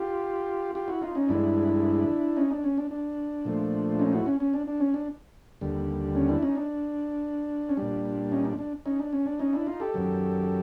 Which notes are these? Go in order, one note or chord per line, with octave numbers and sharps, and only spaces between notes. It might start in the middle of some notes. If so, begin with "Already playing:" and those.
Already playing: F4 G4
F4 G4
E4 F#4
D#4 F4
C#4 D#4
G2 E3 G#3 D4 E4
C#4 D#4
D4
C#4
D4
D4
A#2 F3 A3
C#4 D#4
E4 F#4
C#4
C#4
D4
D4
C#4
D4
D#2 D3 G3
C#4
D4 E4
C#4 D#4
D4
C#4
A#2 G3 D4
C#4 D#4
D4
D4
C#4 D#4
D4
C#4
D4
C#4 D#4
D4 E4
D#4 F4
G4 A4
F#2 D#3 F#3